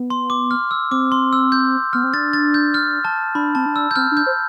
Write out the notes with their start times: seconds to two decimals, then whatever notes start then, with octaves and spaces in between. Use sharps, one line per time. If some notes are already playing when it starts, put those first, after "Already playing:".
Already playing: B3
0.10 C6
0.30 D6
0.51 F6
0.71 E6
0.91 C4 D6
1.12 C6
1.33 E6
1.52 G6
1.93 B3 F6
2.04 C4
2.14 D4 A6
2.33 A6
2.54 G6
2.74 F6
3.05 A5
3.35 D4 B5
3.55 C4 A5
3.66 D4
3.76 E6
3.91 G6
3.96 C4 F6
4.11 D4
4.17 G6
4.26 C5